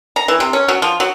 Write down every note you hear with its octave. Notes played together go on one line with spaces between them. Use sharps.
A#5
E3
C3
C#4
F#3
F3
F#3